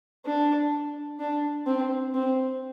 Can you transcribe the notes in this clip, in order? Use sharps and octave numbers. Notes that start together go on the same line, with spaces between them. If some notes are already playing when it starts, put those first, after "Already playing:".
D4
D4
C4
C4